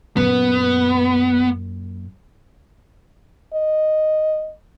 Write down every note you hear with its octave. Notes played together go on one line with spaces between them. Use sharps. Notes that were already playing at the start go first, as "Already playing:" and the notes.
F#2 A#2 B3
D#5